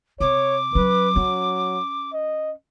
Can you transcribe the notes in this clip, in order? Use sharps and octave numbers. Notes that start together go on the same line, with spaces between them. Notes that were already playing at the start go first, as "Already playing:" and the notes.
C3 C#5 D6
F#3 C#4 B4
F#3 C#4
D#5